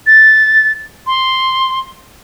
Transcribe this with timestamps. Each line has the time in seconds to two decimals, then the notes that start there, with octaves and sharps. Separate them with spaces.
0.07 A6
1.07 C6